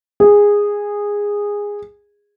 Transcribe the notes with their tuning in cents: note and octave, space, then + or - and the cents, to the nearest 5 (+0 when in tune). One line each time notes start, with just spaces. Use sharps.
G#4 -15